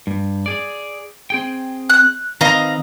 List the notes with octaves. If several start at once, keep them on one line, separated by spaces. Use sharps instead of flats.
G2
G#4 D5
C4 G#4 G5
F#6
D#3 C4 B4 D#5 F5 A#5